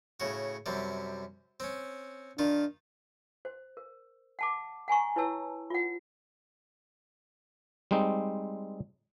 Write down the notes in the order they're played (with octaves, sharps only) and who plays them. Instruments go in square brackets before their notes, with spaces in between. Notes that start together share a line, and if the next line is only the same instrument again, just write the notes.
[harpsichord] A2 C#3 F#4
F#2 C3 G3
C4 C#4
[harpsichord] D#3 F4 [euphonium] D4
[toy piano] C5
A#4
F#5 A5 D6
F#5 G#5 A#5 C#6
E4 B4 C#5 A5 E6
F4 F#5
[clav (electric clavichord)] G3 G#3 C4 D#4